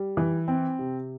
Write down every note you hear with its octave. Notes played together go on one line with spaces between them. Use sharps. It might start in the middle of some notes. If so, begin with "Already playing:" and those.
Already playing: G3
E3
C4
C3